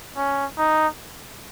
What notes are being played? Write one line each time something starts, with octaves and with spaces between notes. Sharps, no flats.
C#4
D#4